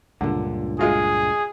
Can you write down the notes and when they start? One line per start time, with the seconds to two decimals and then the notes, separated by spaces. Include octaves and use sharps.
0.21 C#2 G2 A#2 D3
0.79 G#3 F4 F#4 G#4